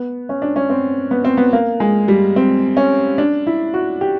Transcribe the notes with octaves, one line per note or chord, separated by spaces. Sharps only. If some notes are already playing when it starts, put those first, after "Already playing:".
Already playing: B3
C#4
D4
C#4
C4
B3
C4
B3
A#3
G#3
G3
C4
C#4
D4
E4
F#4
G4